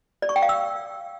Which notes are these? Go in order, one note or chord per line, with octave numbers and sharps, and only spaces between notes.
D5
C#6
G5
F5
E6